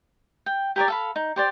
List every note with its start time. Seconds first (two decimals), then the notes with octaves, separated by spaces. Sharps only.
0.46 G5
0.76 G4 A#4 C#5 D5
0.88 A4 F5 B5
1.16 D#4
1.36 G4 C5 D5